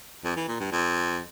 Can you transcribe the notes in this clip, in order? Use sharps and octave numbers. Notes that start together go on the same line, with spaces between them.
F2
E3
A#2
G2
F2